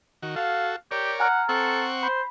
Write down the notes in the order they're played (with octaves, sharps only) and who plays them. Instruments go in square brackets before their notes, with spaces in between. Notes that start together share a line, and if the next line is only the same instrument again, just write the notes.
[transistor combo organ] D#3 F#4
[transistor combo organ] F#4 A4 [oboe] F5
[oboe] G4 [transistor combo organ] A#4 C#5 D5
[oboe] F#5 [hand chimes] G#5 A#5 F6
[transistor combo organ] C4 F#5 C#6 [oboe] A4
[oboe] C5 [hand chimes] B5